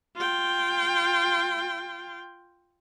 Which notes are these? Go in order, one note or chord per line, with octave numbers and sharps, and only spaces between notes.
F4 G5